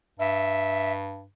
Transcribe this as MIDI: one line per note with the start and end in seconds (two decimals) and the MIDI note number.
0.19 1.26 43
0.19 0.92 76